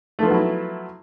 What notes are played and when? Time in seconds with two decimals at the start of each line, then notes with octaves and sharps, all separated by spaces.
0.19 A3
0.23 F3
0.26 B3
0.30 F#3
0.34 E4